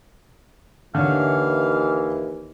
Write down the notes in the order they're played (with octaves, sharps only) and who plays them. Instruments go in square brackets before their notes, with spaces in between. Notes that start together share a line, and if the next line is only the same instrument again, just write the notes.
[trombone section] D#2 E3 [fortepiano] D3 C#5 [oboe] F5